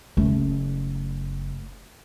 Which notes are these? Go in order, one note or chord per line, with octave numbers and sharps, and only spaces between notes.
F#1 A3